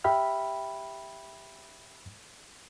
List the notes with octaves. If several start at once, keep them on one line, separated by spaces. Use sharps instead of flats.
G4 E5 G5 B5 F6